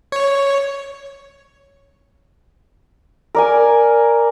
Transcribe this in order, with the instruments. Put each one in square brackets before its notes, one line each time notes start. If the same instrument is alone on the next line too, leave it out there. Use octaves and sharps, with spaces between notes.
[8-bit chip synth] C#5
[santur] A#4 D5 G#5